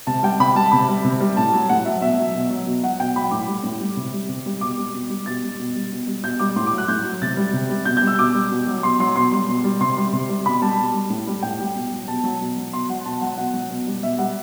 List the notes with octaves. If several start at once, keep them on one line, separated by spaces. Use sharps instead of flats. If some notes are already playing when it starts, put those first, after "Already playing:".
C3 A5
G3 G5
C3 B5
G3 A5
C3 B5
G3
C3
G3
A2 A5
F#3
A2 F#5
F#3 E5
B2 E5
F#3
B2
F#3
B2
F#3 F#5
B2 G5
F#3 B5
A2 D6
G3
A2
G3
C3
G3
C3
G3
B2 D6
G3
B2
G3
B2 A6
G3
B2
G3
B2
G3
B2 G6
G3 D6
A2 C6
D6
F#3
F#6
A2 G6
F#3
C3 A6
G3
C3
G3
B2 G6
G6
G3
E6
B2 D6
G3
B2
F#3
B2 C6
F#3 C6
B2 C6
G3
B2
G3
C3 C6
G3
C3
G3
B2 B5
G3 A5
B2
G3
A2
G3
A2 G5
G3
B2
F#3
B2 A5
F#3
B2
F#3
B2 C6
F#3 F#5
B2 A5
F#3 F#5
B2 F#5
F#3
B2
G3
B2 E5
G3 F#5